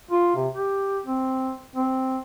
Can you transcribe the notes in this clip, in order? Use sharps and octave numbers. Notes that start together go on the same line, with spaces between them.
F4
C3
G4
C4
C4